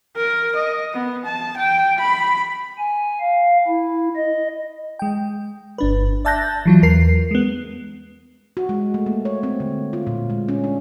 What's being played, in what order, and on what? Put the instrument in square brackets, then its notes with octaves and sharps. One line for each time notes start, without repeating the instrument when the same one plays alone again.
[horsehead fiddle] A#4
D#5
B3
A5
G5
B5
[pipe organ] G#5
F5
E4
D#5
[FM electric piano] G#3 G5
G1 D4 B4
D5 E5 A5 F#6 G6 A#6
E3 F#3 F4
E2 A#4 C7
G#3 B3
[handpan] F#4
G#3
A3
A#3
C#5
C4
D3
F4
A#2
G#3
C#4
D4